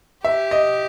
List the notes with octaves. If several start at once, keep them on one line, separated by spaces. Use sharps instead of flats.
G4 E5
D#5